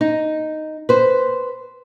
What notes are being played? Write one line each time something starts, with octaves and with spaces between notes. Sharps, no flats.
D#4
B4 C5